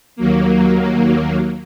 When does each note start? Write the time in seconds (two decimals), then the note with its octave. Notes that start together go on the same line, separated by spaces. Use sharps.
0.16 D#2 F#3 A#3